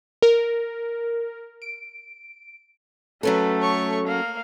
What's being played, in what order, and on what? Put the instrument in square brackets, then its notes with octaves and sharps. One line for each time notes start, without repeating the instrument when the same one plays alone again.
[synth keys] A#4
D7
[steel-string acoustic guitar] F#3 C#4 A4 [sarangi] A3 [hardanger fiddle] B4
[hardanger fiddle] C#5 C#6
[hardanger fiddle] A#3 [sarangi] F5